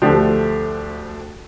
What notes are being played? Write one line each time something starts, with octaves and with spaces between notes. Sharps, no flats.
D2 D3 F3 A3 D4 G4